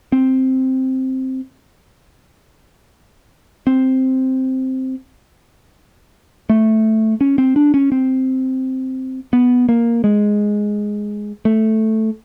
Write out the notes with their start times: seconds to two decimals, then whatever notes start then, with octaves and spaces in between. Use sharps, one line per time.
0.12 C4
3.67 C4
6.50 A3
7.21 C#4
7.38 C4
7.56 D4
7.74 C#4
7.92 C4
9.33 B3
9.69 A#3
10.04 G#3
11.45 A3